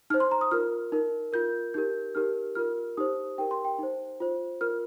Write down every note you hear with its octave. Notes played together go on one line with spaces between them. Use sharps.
D#4 C5 F6
C6
A#5
D#6
F4 A#4 F6
D#4 A#4
F4 A#4 G6
D#4 G4 A#4 G6
D#4 G4 A#4 F6
F4 A#4 F6
D#4 G4 C5 D#6
D#4 G4 A#4 G5
C6
G5
D#4 C5
F4 C5
F4 A#4 F6